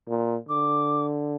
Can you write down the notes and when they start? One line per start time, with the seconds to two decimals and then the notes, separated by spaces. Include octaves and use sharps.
0.08 A#2
0.49 D3 D6